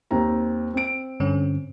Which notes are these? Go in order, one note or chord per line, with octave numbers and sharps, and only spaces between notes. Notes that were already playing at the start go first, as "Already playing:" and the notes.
D#2 C4 A#5
C4 D7
G2 D3 C#4